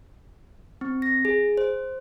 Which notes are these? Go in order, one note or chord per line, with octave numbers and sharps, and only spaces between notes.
C4
A#6
G#4
C5